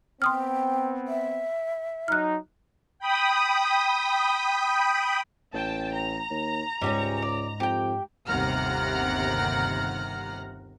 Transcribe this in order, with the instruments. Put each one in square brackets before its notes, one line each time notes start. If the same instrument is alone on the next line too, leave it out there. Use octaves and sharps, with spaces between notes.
[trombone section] B3 C4 [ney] G5 [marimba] C6 D#6 F6
[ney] E5
[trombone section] F#3 D#4 [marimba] F6 F#6
[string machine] G5 B5 D#6
[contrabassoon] A1 [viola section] G5 A5
[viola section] A#5
[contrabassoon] D#2
[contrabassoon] C#2 [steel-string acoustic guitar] G#2 [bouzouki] G3 A#3 C#4
[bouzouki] D5
[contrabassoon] F2 [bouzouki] G4 G5
[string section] G1 D#2 C3 F#5 A#5 F6